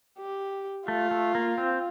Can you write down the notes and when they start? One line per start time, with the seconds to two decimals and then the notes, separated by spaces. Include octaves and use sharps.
0.19 G4
0.88 A3 F4
1.11 A3
1.35 A#3
1.58 C4